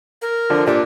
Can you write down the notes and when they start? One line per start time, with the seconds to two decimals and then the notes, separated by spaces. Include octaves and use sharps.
0.22 A#4
0.50 D3 F3 D4
0.67 A#2 D4 G4